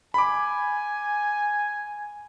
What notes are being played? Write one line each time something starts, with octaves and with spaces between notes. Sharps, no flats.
G#5 B5 D6